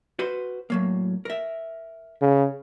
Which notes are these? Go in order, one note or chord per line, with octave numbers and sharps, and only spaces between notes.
F#4 B4 C5
A2 F#3 A#3
A#4 E5
C#3